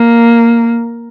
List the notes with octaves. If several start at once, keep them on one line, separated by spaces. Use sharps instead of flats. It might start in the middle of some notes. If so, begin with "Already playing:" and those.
Already playing: A#3